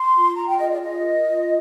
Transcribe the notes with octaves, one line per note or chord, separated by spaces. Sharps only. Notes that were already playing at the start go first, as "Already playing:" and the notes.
Already playing: C6
F4
F4 A#5
G5
G#4 D#5
D5
F4 D#5
A#4
F4